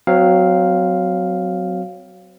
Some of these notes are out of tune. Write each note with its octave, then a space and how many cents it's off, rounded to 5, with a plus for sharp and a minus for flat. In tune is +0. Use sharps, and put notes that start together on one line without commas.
F#3 +0 C4 -25 F5 +0